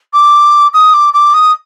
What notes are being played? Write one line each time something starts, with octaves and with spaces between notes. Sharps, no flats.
D6
D#6
D6
D6
D#6